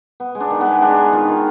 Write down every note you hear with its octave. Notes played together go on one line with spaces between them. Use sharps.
B3
G#3
D4
D#3
B3
G#3
G#3 D4
D#3
D#3 F4
D#3